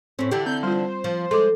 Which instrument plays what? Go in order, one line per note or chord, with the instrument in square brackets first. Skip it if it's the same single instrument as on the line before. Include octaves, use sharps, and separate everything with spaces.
[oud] A2 C#4 [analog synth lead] C4
[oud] D3 E3 D4 [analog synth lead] G4
[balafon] C4 [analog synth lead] G6
[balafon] G3 F4 [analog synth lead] C5
[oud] F3
[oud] G#3 [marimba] A4 [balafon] C6 D6